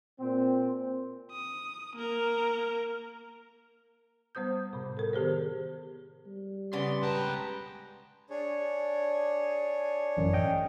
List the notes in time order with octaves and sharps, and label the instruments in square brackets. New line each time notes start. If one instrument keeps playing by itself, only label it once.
[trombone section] A#2 C4
[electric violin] D#6
A#3 A#4
[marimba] G3 B3 C5 D#6 G6
A2 C3
A4 A#4
D#3 B3 G4 G#4 C5
[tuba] G3
[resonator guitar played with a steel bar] C#3 B3 [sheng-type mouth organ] D5 [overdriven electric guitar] C6
[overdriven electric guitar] C#2 A5 [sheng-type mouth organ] B4 G5 A#5
[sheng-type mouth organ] D4 G#4 C#5
[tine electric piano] A1 F#2
D#5 G5